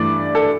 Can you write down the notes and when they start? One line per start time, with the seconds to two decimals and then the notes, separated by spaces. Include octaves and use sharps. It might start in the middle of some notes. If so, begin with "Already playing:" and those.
Already playing: G2 E3 A3 D4 D5
0.35 A4